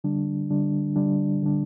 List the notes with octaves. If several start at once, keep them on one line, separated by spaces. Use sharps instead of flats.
D3 G3 D4
D3 G3 D4
D3 G3 D4
D3 G3 D4